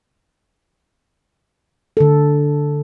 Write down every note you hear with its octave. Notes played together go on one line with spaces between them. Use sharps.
D3 A4